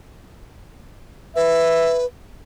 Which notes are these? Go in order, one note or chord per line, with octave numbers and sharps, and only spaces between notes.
B4 E5